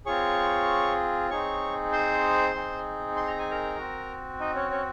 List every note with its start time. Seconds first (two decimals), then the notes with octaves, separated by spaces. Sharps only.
0.06 C4 F4 G#4 C#5 C#6
1.30 C4 D#4 G#4 C#5 C#6
1.92 C5 C6
2.54 C4 D#4 G#4
3.16 C6
3.27 A#5
3.39 G#5
3.51 A#4 A#5
3.78 C4 F#4
4.40 D#4 D#5
4.55 C#4 C#5
4.71 C#4 C#5